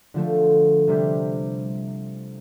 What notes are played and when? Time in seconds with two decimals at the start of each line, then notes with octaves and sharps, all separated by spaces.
0.14 D3 F3 A3
0.88 C3 G3 D4 G4